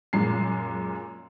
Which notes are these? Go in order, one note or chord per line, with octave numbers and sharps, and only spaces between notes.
F#2 A#2 G#3 C7